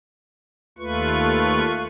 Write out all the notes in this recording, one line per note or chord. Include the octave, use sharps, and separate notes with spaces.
D#2 A3 F4 B4 C#6